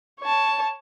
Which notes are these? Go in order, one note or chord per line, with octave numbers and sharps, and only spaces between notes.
C#5 A5